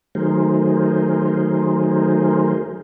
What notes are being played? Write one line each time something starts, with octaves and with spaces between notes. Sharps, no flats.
D#3 F#3 A3 G#4 A#4 C5